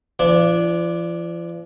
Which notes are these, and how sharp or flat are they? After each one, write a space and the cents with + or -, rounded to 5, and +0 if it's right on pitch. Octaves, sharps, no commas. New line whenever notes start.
F3 -40 D4 +0